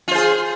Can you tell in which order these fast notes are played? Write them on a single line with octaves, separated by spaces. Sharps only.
F4 C5 G#4